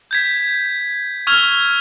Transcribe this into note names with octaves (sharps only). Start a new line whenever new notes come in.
G6 G#6 B6
C#6 E6 F6 G#6 F7